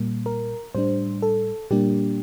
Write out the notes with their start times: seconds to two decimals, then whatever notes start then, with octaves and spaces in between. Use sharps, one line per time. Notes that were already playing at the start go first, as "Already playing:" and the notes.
Already playing: A#2 G3 A#3
0.26 A#4
0.75 A2 G3 D4 C5
1.22 A4
1.70 A#2 G3 A#3 D4 G4